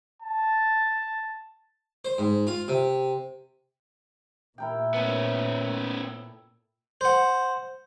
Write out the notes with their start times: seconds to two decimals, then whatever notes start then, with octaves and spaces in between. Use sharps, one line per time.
0.22 A5
2.05 C5
2.18 G#2
2.47 F4
2.68 C3
4.58 A#2 E4 A#4 G5
4.94 B3 C#4 A4
7.01 C5 F#5